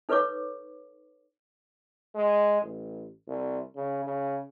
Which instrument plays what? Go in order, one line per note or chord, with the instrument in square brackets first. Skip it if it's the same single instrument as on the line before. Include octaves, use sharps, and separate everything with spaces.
[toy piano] D#4 A4 B4 C#5 C#6 D6
[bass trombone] G#3
A1
C2
C#3
C#3